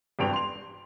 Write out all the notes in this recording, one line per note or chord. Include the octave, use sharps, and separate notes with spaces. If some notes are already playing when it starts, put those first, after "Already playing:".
G#1 E2 G2 G5 F7
C6 F7